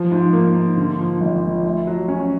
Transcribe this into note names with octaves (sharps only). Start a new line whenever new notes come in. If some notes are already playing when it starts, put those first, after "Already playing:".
Already playing: F3
G#2
A#3
G#2
D3
F3
G#1
F3
A3
F#3
C#4